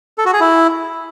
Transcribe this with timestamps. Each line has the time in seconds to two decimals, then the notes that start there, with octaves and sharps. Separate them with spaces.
0.18 A4
0.25 F#4
0.33 G#4
0.40 E4